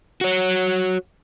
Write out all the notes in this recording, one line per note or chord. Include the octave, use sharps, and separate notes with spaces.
F#4 C#5